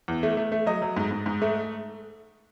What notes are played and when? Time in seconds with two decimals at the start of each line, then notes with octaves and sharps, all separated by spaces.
0.08 E2
0.23 A3
0.37 A3
0.52 A3
0.66 F#3 D#5
0.82 F#3
0.96 G#2
1.11 G#2
1.26 G#2
1.42 A3